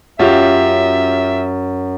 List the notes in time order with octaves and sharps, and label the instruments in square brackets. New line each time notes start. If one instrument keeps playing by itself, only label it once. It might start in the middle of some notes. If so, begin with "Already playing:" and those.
[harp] F#2 [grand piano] C#4 F4 G4 [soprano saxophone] E5